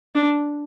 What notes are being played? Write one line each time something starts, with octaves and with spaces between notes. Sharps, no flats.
D4